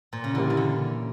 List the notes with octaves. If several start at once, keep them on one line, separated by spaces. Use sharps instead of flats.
A#2
C#3
D3 E3 A#3 E4 G4
C#3
D3